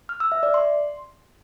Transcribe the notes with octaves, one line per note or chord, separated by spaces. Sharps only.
F6
E6
E5
D5
C6